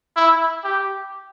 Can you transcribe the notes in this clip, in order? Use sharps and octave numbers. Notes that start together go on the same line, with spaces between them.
E4
G4